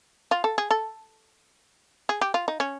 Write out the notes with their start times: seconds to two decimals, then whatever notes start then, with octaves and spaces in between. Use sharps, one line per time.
0.31 F4
0.44 A4
0.58 G#4
0.71 A4
2.09 G#4
2.21 G4
2.34 F4
2.48 D#4
2.60 C#4